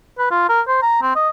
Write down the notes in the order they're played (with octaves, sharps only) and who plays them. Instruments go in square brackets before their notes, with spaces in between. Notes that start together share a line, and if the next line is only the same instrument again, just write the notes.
[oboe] B4
F4
A#4
C5
A#5
C4
D#5